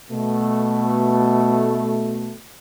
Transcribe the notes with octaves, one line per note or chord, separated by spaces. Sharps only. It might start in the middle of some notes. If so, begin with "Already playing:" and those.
B2 A3